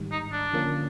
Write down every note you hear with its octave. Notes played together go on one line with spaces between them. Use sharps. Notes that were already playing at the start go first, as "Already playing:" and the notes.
Already playing: G#2 D#3 G3
D#4
D4
D3 F3 A#3 C#4